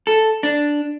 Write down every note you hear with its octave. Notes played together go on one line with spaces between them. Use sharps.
A4
D4